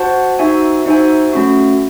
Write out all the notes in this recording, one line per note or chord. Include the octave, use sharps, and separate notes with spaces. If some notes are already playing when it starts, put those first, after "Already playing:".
Already playing: F#4 C5 F#5 A5
D#4 F#4 C5 E5 G#5
D#4 F#4 C5 E5 G#5
A3 C#4 F#4